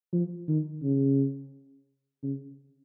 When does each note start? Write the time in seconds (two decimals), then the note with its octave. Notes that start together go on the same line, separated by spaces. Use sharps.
0.13 F3
0.48 D#3
0.83 C#3
2.23 C#3